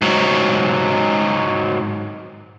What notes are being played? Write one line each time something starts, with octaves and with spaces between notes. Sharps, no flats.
G#2 F#3